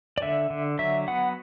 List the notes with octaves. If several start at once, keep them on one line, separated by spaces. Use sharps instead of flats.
D5
D3 E5
D3
F#3 E5
B3 F#5